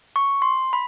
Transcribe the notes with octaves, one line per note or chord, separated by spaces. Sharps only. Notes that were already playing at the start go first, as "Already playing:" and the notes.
C#6
C6
B5